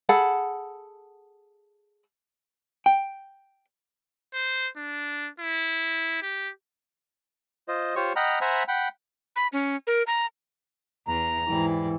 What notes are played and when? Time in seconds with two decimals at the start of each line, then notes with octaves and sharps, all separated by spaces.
0.09 G#4 A4 F#5 B5
2.86 G5
4.34 C5
4.77 D4
5.40 E4
6.23 G4
7.68 F4 C5 D#5
7.96 F4 G4 C5 C#5 C#6
8.16 D#5 F#5 G5 A#5 B5 F6
8.41 C5 E5 F#5 G#5 A#5 B5
8.68 F#5 G5 B5
9.36 B5
9.52 C#4
9.87 A#4
10.07 A#5
11.08 E2 A#5
11.48 G#2 E3 G3